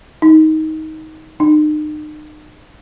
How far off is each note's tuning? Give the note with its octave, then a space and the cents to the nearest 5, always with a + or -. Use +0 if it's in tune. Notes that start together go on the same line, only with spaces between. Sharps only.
D#4 +15
D#4 -40